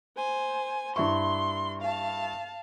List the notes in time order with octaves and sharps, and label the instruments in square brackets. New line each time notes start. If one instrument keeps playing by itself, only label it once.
[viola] C5 G#5
[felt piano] G2 E4 C#6 [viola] C6
[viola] F5 A5